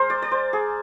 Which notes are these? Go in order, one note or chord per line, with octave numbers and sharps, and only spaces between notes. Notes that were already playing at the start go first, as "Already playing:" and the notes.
Already playing: G#3 A#4 C5
D5
D5
C5
G#4